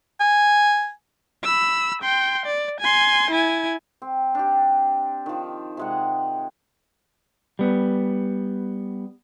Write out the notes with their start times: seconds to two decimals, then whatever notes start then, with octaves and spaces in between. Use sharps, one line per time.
0.21 G#5
1.44 B5 E6
2.02 G5 C6
2.46 D5
2.80 G#5 C6
3.31 E4 G#5
4.02 C4
4.35 D4 G4
5.26 D#3 F3
5.77 C3 G#3 F#5
7.59 G3 B3